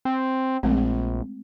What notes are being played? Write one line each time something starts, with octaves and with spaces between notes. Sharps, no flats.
C4
A#1 G#3 A3 C4